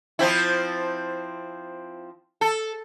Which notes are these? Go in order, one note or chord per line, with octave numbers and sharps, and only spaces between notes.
F3 C4 E4
A4